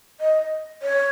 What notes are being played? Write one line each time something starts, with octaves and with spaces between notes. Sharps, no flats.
D#5
C#5